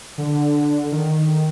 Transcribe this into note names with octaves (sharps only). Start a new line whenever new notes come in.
D3
D#3